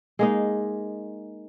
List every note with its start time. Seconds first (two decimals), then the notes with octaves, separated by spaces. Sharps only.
0.19 G#3 A#3 D#4